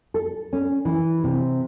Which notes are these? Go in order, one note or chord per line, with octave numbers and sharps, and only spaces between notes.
A4
C#4
E3
C3